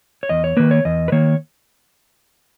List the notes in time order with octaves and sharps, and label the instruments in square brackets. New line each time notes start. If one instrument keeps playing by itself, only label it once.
[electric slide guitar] C#5
E2 D#5
C#5
D#3 A#3 B4
C#5
E2 D#5
B4
D#3 A#3 C#5